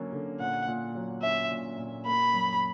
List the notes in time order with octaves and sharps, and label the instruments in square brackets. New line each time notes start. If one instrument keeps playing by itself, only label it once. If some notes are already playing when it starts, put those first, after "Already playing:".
Already playing: [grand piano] D3 F#3 A#3 C#4
D3
[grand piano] A#2 [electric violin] F#5
[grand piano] A#2
F#3
[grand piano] C#4 [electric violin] E5
[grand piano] A#2
A#2
[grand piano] A#3 [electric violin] B5
[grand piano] F#2